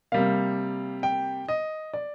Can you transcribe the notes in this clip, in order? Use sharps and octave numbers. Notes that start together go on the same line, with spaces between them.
C3 G3 A#3 F5
G5
D#5
D5